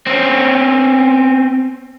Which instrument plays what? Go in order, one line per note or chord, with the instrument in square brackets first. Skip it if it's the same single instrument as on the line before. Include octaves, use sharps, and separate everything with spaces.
[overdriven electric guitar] C4 C#4